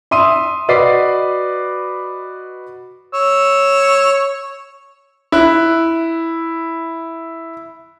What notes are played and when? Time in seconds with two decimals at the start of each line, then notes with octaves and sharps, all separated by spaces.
0.11 E5 C6 D#6 D#7
0.68 F#4 B4 D5 D#5 B6 C7
3.13 C#5 E6
5.32 E4 F#6